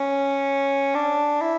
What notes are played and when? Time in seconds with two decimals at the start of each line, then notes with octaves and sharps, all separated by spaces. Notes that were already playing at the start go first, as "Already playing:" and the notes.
Already playing: C#4
0.95 D4
1.41 E4